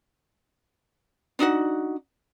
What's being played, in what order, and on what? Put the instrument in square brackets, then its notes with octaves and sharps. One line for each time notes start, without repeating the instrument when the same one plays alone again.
[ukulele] D4 D#4 F#4 F#5